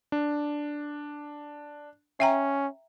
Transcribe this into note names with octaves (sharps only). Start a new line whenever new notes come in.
D4
C#4 E5 G5 A#5